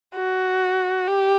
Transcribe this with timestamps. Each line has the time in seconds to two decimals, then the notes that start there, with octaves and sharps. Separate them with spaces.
0.15 F#4
1.08 G4